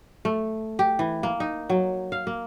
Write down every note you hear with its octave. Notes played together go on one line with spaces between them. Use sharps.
A3
G4
E3
A#3
D#4
F#3
F5
A#3